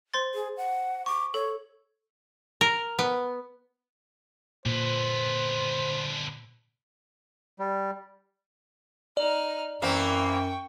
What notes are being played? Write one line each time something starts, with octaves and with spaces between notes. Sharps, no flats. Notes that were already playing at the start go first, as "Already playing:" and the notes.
C5 C6 A6
G#4
F#5
C#6 D6
A4 C#5
A#4
B3
A#2 D3 B3 C5
G3
D#4 D5 F6
F#2 E3 A#3 C4 G5 C#6